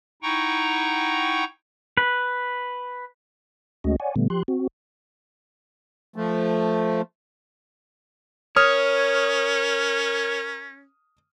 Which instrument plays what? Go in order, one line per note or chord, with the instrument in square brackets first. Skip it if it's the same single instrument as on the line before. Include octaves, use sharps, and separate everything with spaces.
[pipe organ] D#4 E4 F#5 G5 A#5 C#6
[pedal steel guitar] B4
[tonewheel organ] D2 G#3 A3 C#4 F#4 D#5
C#5 D5 F#5 G#5
A#2 D3 G3 A3 B3
F3 G4 C6 F#6
C4 F#4
[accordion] F3 A3
[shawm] C#4 [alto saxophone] A#4 [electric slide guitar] C#5 [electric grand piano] D#6 F6